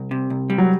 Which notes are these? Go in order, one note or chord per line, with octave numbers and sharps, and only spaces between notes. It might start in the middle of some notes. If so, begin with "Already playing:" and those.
Already playing: C2
C3
C2
G3
F#3